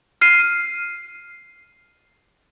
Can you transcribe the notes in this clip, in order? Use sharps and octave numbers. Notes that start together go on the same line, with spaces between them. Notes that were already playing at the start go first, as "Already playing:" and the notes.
F6 C7 D#7